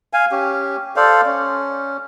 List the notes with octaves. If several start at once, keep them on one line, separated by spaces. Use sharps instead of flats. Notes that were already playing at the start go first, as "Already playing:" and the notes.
F5 G#5
C#4 G4
A4 C5 D5 F5
C#4